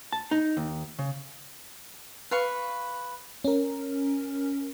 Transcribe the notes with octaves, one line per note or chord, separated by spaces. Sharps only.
A5
D#4
D#2
C#3
B4 F5 C#6
C#4 A#4